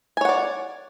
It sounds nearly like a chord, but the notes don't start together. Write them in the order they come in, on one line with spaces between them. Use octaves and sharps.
G#5 C#5 F#5 D5